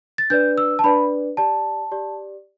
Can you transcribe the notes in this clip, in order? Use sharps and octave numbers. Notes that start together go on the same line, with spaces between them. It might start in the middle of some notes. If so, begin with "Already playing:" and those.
A6
D4 B4 D5 G6
E6
A5
D4 B4 D5 B5
G4 D5 A5
G4 D5